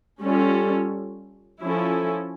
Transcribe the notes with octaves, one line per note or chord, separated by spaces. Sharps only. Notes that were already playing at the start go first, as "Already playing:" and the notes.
G3 C#4 F4 A4
F3 C#4 E4 A4